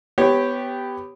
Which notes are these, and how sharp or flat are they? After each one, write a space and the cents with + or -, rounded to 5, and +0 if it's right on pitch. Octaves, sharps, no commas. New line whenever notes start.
B3 +10 G4 +0 C#5 -15